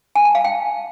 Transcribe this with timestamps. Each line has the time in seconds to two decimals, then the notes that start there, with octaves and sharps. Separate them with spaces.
0.15 G#5
0.25 A5
0.35 F5
0.44 G5